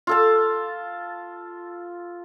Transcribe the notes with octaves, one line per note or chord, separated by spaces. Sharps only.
F4 A4 A5